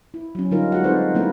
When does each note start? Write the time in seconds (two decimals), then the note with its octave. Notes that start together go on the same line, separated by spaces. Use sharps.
0.14 E4
0.35 F#3 C#4
0.51 D3 G3 D#4 F4 A#4
0.72 G#3 F#4 F#5
0.84 C4 D#4 A4 B4 C5 D5
1.15 F3 G3 A#3 C#4 E4 A#4